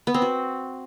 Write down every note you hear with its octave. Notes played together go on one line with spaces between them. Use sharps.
B3
C4
F#4